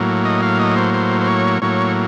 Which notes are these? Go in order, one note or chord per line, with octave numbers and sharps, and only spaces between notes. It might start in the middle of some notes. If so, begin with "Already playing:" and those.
Already playing: A2 F#3 A#3
D#5
F5
D#5
C5
C5
C5
C#5
A2 F#3 A#3 C#5